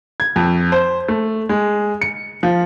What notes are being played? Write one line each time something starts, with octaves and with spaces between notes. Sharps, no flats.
G#6
F2
C5
A3
G#3
C#7
F3